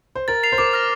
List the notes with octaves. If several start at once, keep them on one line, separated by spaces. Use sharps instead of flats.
C5
A#4 A6
C7 F7
C5
A#4 D6
F6 A#6